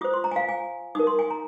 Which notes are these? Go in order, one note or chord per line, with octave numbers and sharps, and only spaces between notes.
F4 C5 D#6
C6
A#5
G#5
F5
G#5
D#4 A#4 D#6
C6
G#5
A#5